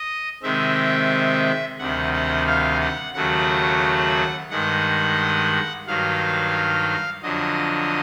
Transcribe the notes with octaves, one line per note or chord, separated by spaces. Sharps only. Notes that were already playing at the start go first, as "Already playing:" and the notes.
Already playing: D#5
C3 D#3 G#3 C4 E5
D2 C3 D#3 G3 F#5
F#5
F5
F#5
D#2 C#3 F#3 A3 F#5
G2 D#3 G#3 F#5
G2 D#3 F#3 F5
F2 D3 F#3 D#5